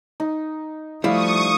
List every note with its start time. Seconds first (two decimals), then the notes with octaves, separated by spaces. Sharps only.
0.20 D#4
1.04 F3 G3 A3 E4 F5 C#6 D#6